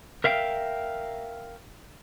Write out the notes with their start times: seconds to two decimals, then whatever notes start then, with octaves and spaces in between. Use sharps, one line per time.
0.24 A#4 E5 F5 G5